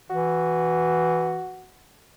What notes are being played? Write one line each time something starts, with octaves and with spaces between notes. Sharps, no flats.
E3 F#4